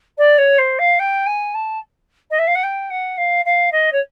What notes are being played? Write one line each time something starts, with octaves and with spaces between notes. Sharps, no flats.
D5
C#5
C5
F5
G5
G#5
A5
D#5
E5
F5
F#5
G5
F#5
F5
F5
D#5
C#5